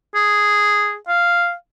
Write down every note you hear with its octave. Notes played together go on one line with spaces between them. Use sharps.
G#4
F5